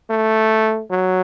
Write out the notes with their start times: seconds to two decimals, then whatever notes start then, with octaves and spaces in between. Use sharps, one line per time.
0.10 A3
0.90 F#3